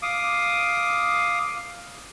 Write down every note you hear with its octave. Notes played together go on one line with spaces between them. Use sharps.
F5 D6 D#6